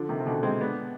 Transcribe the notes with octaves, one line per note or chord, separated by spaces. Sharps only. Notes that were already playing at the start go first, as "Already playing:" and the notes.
Already playing: D3 F3
C3 D#3
C3
B2 D3
G#3 C4
B3 D4